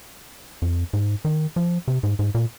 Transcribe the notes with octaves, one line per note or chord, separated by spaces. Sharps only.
F2
G#2
D#3
F3
C3
G#2
G#2
A#2